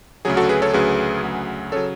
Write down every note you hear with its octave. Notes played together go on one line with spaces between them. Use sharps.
D2 C#3 F#3 G#4
F#4 A4
G#4 B4
A4 C#5
D2 C#3 F#3 G#4 B4
D2 C#3 F#3
C#3 F#3 A4 C#5